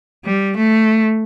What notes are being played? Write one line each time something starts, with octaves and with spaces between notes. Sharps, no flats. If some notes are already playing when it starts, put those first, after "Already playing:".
G3
A3